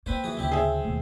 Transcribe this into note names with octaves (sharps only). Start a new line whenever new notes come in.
A#3 C4 B4 C5
E3 F3 F#4 G#4
D2 C#3 F3 C4 E4 G4
C4 G#4 E5
D#2 B2 A3 A#3